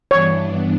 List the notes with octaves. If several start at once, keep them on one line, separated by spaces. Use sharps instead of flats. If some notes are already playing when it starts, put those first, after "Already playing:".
G2 E3 B3 D4 C#5